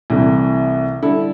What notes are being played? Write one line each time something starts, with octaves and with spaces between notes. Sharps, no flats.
C2 C3 E3 A3
D3 G3 E4 A4